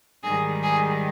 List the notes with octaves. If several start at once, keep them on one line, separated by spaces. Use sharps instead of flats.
G#2 D#3 G3 G#4
G#4